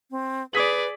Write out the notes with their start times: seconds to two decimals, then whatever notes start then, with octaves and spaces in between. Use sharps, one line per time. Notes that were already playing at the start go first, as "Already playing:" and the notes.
0.11 C4
0.53 G#4 B4 D5 D#6 B6 F#7